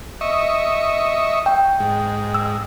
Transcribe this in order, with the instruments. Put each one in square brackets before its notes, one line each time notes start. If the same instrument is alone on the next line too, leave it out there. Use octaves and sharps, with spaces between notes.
[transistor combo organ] D#5 E5 C#6
[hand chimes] G5
[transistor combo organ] G#2
[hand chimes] E6